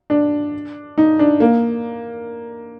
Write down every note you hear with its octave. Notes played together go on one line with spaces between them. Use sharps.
D4
D#4
D4
A#3